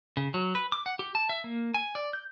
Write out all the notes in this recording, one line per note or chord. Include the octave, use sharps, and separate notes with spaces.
C#3
F#3
B4
D6
F#5
G4
A5
E5
A#3
G#5
D5
G6